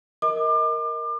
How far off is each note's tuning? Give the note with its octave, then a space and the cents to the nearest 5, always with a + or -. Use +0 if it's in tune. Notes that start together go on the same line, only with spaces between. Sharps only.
A#4 +0 D#5 +25 D6 +35